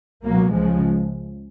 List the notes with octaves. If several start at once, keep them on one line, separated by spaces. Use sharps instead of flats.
C#2 B2 F#3 A#3
C#2 C#3 F3 G#3